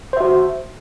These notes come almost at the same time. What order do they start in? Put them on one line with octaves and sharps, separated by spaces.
C5 E5 F#4